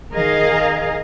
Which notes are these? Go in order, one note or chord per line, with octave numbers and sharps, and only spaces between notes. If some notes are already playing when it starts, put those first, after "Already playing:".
D#3 G#4 A#4 D#5 F5